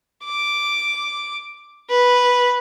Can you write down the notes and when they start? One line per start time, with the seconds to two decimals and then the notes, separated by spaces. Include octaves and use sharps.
0.24 D6
1.90 B4